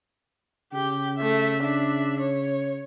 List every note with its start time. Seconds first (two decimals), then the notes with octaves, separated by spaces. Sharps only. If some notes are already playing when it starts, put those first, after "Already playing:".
0.73 C#3 G4 G5
1.17 A3 E5
1.62 D4 E5
2.19 C#5